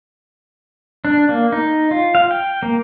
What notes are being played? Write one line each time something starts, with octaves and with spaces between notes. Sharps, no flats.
D4
A#3
D#4
F4
F5
G5
A#3